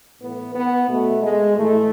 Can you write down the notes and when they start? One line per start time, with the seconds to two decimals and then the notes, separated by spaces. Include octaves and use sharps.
0.21 A2 E3 B3
0.55 B3
0.88 B2 A3
1.22 G#3
1.56 A2 E3 A3